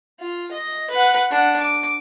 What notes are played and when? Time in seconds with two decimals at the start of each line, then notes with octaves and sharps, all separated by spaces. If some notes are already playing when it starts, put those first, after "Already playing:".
0.20 F4
0.52 D#5
0.91 B4 F#5
1.31 D4 F#5
1.60 D6